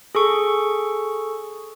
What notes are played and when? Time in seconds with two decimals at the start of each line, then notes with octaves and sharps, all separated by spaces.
0.15 G#4 A4 C#6